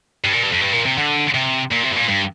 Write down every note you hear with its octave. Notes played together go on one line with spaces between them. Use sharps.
G2
A#2
G2
F2
G2
A#2
C3
D3
C3
A#2
C3
G2
A#2
G2